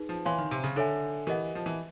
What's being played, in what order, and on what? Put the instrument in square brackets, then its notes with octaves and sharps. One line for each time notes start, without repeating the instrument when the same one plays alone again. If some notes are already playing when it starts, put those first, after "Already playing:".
Already playing: [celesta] D#4 G#4 B4
[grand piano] F3
[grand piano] E3 [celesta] C#5 F5 G#5 C6
[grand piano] D#3
C3
C#3
[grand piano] D3 [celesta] A4 C#5 E5 G#5
[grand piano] E3 [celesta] G4 A#4 D#5 F#5
[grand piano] F3
E3